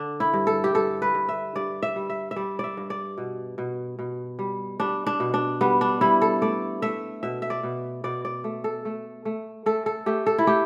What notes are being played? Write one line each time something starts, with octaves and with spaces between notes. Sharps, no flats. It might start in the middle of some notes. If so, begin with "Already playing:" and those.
Already playing: D3 D4
E4
G2
A4
G4
G2 A4
B4
G2
E5
G2 D5
E5
G3
E5
E5
G3 D5
D5 E5
G2
D5
B2
B2
B2
G3
G3 D4
D4
B2
D4
G3 B3
D4
G3 E4
A4
A3 D5
A3 E5
B2 E5
E5
D5
B2
B2 D5
D5
A3
A4
A3
A3
A3 A4
A4
A3 G4
A4
E4
A3 G4